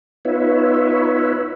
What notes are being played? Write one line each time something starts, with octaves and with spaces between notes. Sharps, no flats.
B3 D#4 F4 B4 C#5 E5